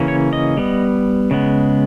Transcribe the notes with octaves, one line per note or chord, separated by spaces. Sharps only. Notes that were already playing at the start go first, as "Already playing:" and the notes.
Already playing: C#3 E3 A#3 C#4
C#5
D#5
G3 B3
C#3 G#3 B3